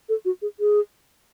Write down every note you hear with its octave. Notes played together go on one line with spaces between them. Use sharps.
A4
F#4
G#4
G#4